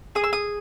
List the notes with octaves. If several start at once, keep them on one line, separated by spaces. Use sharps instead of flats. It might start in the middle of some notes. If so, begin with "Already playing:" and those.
G#4 D#6
E6
D#6